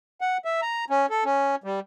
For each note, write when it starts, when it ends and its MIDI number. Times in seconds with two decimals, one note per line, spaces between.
0.21 0.37 78
0.45 0.61 76
0.62 0.85 82
0.90 1.06 61
1.10 1.24 69
1.25 1.55 61
1.64 1.80 55